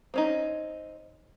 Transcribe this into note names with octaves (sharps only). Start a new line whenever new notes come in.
C4 C#4 D#4